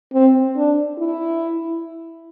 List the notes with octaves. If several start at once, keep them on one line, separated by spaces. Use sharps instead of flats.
C4
D4
E4